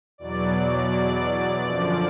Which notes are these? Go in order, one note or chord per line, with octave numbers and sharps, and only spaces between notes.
E2 B2 F#3 D5
D5
F#2 D3 F3 D5